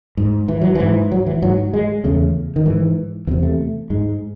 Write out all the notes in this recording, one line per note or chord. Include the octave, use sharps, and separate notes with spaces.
G#2
E3
F#3
G#2 E3
F#3
E3
G#2 F#3
G#3
E2 C#3 A3
D#3
G#2 E3
E2 C3 E3
A3
G#2 G#3